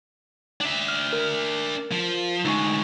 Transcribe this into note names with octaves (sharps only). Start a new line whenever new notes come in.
D4 E5
F6
A#4
F3
D2 G#3 D#4 C#6